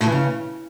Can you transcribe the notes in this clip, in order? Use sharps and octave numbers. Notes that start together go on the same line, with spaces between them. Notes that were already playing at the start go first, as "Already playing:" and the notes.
A2
E3
C#3